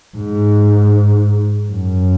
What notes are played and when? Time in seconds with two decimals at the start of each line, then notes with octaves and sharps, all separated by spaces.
0.17 G#2
1.70 F#2